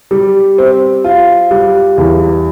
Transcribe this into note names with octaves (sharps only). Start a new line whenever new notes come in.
G3
C4
F4
G3
E2